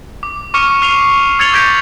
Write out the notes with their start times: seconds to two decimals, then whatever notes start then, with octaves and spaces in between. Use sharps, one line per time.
0.23 D6
0.54 C#6 D6 F6 C#7 D#7
0.82 F6 C7 F7
1.39 E6 G#6 A6 C#7 F7 G7
1.53 D6 G6 G#6 A#6 B6 D7